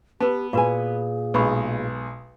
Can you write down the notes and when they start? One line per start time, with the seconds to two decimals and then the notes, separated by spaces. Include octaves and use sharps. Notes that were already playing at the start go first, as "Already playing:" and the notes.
0.20 B3 G4 B4 A5
0.53 A#2 F4 F#4 G#4 B4 G#5
1.34 B1 G#3 B4 B5 C#6